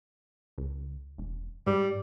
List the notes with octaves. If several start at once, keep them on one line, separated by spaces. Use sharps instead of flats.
C#2
E1
G#2 G3